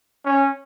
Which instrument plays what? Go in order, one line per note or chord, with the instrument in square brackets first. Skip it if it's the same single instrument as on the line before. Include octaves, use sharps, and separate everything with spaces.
[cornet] C#4